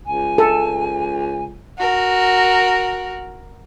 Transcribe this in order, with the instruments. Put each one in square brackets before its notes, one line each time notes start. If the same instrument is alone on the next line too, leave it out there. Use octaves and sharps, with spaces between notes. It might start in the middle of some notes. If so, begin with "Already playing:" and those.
[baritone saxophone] C#2 [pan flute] G#5
[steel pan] A4
[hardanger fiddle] F#4 A#4